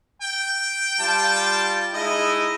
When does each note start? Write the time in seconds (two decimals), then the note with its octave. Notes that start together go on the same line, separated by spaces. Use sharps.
0.22 G5
1.01 G3 F4 A5
1.94 G#3 D#4 E4 D#5